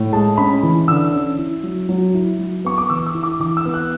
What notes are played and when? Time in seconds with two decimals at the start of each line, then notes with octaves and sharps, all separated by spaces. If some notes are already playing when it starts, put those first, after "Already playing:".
Already playing: A2
0.13 G#3 A5
0.38 C#4 B5
0.63 E3
0.88 D3 E6
1.13 C#4
1.39 E4
1.63 F#3
1.89 F#3
2.14 E4
2.39 F#3
2.65 B3 C#6
2.78 D6
2.90 E3 E6
3.06 E6
3.15 E4
3.23 D6
3.40 E3 D6
3.57 E6
3.65 B3
3.74 F#6